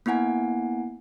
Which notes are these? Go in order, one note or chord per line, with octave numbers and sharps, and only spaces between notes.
A#3 B3 E4 F#5 G#5